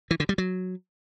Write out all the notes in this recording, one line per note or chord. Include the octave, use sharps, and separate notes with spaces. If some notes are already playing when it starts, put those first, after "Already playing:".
E3
D3
G3
F#3